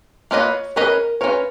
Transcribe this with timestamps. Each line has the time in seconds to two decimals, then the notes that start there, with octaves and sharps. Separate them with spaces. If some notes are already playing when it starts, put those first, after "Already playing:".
0.31 A#3 F4 B4 C#5 D#5
0.76 F#3 C#4 G#4 A#4 B4 D#5
1.21 C#4 F4 A#4 B4 C#5